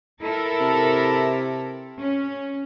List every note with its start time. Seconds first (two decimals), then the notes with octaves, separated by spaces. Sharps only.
0.22 E4 A4 A#4
0.61 C3
2.00 C#4